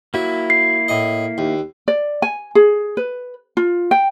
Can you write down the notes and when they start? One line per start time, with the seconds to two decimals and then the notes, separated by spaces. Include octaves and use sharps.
0.14 F#3 A#3 E4
0.50 C7
0.88 A2 D#5
1.38 D#2
1.88 D5
2.22 G#5
2.55 G#4
2.97 B4
3.57 F4
3.91 G5